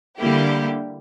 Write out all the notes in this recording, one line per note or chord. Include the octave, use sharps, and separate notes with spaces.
D3 G3 A#3 E4 G4